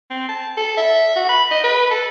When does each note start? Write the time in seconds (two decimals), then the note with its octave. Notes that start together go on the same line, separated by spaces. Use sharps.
0.10 C4
0.29 A5
0.57 A4
0.77 E5
1.16 F#4
1.29 B5
1.51 D#5
1.64 B4
1.90 A4